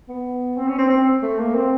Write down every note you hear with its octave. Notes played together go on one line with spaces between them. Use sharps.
B3
C4
C#4
C4
C4
A3
A#3
C4